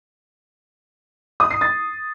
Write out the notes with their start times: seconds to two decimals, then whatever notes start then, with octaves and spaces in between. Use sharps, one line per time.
1.40 D#6
1.51 C7
1.61 A6